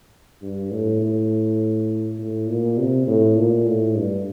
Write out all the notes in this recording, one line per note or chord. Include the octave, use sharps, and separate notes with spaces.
G2
A2
A2
A2
A#2
C3
A2
A#2
A2
G2